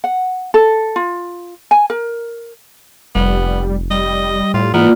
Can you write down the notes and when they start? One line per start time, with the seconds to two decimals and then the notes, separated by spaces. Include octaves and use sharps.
0.04 F#5
0.54 A4
0.96 F4
1.71 G#5
1.90 A#4
3.15 F1 G3 B3
3.91 G3 D#5
4.54 A2 F4
4.74 G#2 E3 A#3 B3 F4 D5